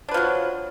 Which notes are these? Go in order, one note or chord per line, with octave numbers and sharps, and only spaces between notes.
F3 F#3 D4 B4